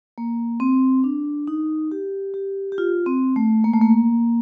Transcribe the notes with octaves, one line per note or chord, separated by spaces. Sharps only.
A#3
C4
D4
D#4
G4
G4
G4
F4
C4
A3
A#3
A3
A#3